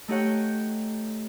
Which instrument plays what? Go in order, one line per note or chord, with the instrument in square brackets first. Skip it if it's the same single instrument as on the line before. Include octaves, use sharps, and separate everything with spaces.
[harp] A3 D#4 G4 C#5 F#5 G5